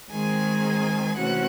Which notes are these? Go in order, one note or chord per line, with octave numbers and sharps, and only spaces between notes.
D#3 G#3 C4 G#4 G#5
C3 E3 A3 C#4 F#4 F#5